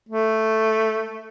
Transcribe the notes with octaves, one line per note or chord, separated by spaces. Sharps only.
A3